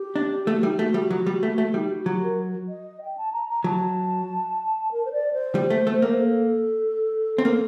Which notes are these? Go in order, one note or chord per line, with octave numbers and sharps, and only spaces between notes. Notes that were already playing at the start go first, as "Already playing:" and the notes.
Already playing: G4
D4
A3 G4
F#4
G3 D#4
A3 F#4
G3
F#3
G3
A3
A3
G3 D#4
F#4
F#3 G4
A#4
D#5
G5
A5
A#5
A#5
F#3 A5
A#4
C5
D5
C5
G3
A3
A3
A#3
A4
C4
A#3 A4